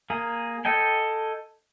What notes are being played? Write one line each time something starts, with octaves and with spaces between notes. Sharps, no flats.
A#3 G#4
A4 D#5 G5 G#5